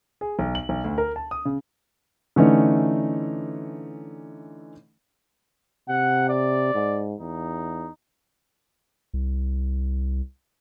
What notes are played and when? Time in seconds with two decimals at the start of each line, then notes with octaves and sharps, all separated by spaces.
0.21 G#4
0.39 B1
0.55 F#7
0.69 B1
0.84 D2
0.98 A#4
1.16 A5
1.31 D#6
1.45 C#3
2.36 D3 E3 A3 C#4 D#4
5.89 C3 F#5
6.29 D5
6.75 G#2
7.20 E2 D#4
9.14 C2